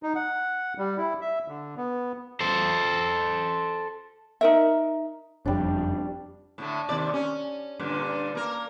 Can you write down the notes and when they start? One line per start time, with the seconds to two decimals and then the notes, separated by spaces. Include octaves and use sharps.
0.03 D#4
0.15 F#5
0.78 G3
0.98 E4
1.21 E5
1.48 D3
1.77 B3
2.40 A4 C5
4.41 D#4 A#4 E5
5.46 F#1 F2 G3 D4
6.58 A2 D3 A3
6.89 D#2 C3 D5
7.14 C#4
7.79 G2 A#2 D3
8.35 A#3 A#4